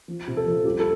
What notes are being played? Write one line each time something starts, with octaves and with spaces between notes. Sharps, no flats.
F3
C3
A4
F3
G3 G4
A4